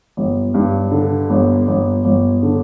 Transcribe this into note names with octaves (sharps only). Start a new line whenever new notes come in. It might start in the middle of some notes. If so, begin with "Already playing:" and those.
G1
G2
D3
G1
G1
G1
D3